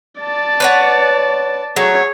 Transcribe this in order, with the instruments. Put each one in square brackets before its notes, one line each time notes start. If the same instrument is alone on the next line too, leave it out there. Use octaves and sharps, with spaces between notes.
[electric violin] D5 A5
[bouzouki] B4 C#5 F#5
[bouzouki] F#3 A3 [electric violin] G#4 C#5